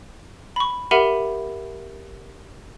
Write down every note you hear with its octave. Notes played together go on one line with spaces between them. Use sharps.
B5 C#6
G4 A#4 E5 F#5 B5 D#7